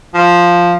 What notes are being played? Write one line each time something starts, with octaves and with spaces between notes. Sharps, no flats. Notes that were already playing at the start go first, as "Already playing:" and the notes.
F3